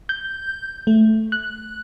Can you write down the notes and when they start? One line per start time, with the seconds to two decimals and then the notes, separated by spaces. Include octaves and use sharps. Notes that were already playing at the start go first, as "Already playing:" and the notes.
0.09 G6
0.87 A3
1.32 F#6